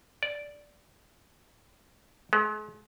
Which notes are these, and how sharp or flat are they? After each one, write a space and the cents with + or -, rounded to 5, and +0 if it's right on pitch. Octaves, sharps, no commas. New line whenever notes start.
D5 -5
G#3 +40